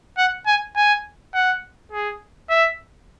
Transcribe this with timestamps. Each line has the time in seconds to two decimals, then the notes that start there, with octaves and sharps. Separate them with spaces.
0.18 F#5
0.46 G#5
0.76 G#5
1.34 F#5
1.92 G#4
2.49 E5